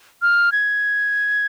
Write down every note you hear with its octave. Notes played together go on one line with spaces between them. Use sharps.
F6
G#6